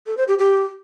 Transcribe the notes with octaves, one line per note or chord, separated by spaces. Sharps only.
A4
C5
G4
G4